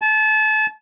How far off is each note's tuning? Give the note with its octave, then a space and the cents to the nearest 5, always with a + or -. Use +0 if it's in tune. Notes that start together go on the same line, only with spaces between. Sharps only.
A5 -30